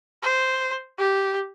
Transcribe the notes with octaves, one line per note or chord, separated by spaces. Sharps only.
C5
G4